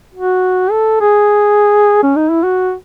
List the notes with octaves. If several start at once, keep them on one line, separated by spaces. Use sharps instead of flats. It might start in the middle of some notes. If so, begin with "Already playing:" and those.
F#4
A4
G#4
C#4
D#4
E4
F#4